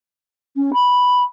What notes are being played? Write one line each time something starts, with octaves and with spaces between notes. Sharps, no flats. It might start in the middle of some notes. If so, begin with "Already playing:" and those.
C#4
B5